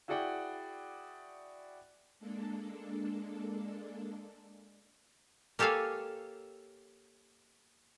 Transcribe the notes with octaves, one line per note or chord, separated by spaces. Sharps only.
E4 F#4 G#4 D5 F#5 G5
G#3 A#3 D4 A4
A#3 G4 A4 C#5 F5 G#5